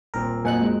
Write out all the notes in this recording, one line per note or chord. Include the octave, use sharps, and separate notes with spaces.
D#1 A#2 C4 A#4
F2 A#2 F#3 C5 D#5 F#5 G#5 F#6
G#3